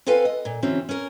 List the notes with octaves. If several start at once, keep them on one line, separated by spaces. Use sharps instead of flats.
C4 F4 A4 B4 F5 G#5
D#5
A#2
D3 E3 F#3 C4 C#4
C#4 A#4